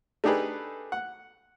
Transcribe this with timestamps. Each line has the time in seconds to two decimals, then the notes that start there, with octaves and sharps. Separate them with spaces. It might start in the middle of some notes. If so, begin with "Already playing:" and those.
0.24 A3 D4 D#4 G4 G#4 B4
0.92 F#5